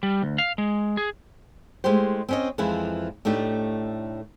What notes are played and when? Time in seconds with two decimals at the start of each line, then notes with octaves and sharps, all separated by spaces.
0.03 G3
0.22 D2
0.38 F5
0.58 G#3
0.97 G#4
1.84 G#3 A3 E4 G4 C5
2.28 C4 C#4 D#5
2.58 F2 E3 F3 G#3 E4
3.25 A2 A3 D4 D#4 G4